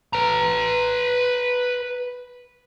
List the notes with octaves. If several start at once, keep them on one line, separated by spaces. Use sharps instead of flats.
B4 A#5